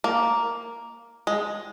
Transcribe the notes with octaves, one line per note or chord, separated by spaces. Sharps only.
A#3
G#3